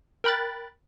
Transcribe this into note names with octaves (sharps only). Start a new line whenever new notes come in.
A#4 G5 B5 F#6 A6